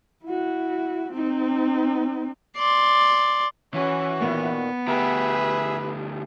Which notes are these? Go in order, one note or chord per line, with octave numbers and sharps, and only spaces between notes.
E4 F#4
C4 D#4
D5 C6
E3 C#4 F#4
A#2 D#3 B3
D2 G4 G#4 B4 E5